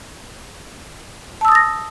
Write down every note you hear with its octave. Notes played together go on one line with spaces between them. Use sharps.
A5 D#6 E6 A6 A#6